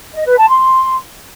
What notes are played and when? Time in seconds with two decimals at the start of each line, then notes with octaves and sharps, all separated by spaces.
0.15 D#5
0.26 B4
0.38 A5
0.49 C6